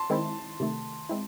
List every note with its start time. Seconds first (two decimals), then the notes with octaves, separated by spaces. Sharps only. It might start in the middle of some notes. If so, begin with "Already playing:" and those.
Already playing: A5 C6
0.10 D#3 G#3 C4 E4
0.60 C3 D#3 A3
1.09 G#3 C4 E4